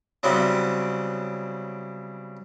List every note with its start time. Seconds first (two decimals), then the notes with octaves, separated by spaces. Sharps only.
0.23 C#3 F#3 G3 B3 C4 E4